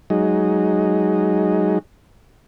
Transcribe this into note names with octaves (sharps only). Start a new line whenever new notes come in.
F#3 G#3 D#4